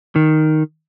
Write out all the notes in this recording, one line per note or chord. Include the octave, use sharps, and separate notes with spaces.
D#3